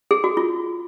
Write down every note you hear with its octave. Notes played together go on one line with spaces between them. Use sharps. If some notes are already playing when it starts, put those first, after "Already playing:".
G#4
F#4
F4